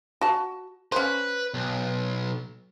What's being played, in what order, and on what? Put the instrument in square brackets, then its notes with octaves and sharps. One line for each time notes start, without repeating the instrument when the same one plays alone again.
[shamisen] F#4 A5
[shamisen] C#4 C5 [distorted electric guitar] B4
[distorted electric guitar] B1